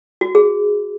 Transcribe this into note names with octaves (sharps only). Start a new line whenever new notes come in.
F#4
G#4